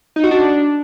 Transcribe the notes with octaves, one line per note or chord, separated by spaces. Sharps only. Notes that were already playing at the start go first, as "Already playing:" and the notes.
D#4
F#4
D4